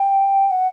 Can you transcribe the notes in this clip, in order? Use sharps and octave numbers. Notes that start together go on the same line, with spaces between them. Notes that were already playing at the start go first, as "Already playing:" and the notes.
Already playing: G5
F#5